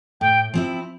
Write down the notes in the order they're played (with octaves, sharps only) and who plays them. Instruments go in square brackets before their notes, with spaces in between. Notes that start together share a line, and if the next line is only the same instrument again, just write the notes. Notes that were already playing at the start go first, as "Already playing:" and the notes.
[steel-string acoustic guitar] A2 [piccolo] G5
[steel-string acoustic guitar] F3 C4 E4